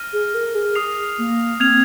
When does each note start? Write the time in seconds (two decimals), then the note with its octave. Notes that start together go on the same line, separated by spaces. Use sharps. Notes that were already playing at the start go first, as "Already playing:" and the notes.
Already playing: F6 A#6 D#7
0.13 G#4
0.34 A#4
0.55 G#4
0.75 D#6 C7 F7
1.18 A#3
1.60 C4 F6 G#6 F7